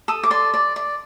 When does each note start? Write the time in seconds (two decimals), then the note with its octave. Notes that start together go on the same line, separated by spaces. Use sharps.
0.08 A4 D#6
0.23 D6
0.31 D5 C6
0.54 D5
0.76 D5